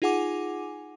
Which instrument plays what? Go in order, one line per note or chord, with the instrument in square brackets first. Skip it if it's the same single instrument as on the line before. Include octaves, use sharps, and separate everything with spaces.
[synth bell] D#4 F4 G#4 F#5 G#5 D6